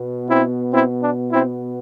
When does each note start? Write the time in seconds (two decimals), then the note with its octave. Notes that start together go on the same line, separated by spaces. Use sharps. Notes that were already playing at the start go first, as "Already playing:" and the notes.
Already playing: B2 B3
0.29 C4 E4
0.73 C4 E4
1.03 D4
1.32 C4 E4